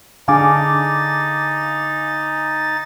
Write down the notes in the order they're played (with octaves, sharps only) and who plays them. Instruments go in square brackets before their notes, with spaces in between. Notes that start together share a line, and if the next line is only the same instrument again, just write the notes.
[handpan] D3 D4 G#4 [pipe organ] D#4 A6 [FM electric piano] F5 G#5 D6